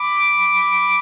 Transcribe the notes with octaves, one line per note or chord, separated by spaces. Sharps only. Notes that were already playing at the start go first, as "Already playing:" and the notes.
Already playing: B5 D6